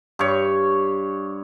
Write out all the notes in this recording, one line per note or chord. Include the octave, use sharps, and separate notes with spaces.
G2 C#5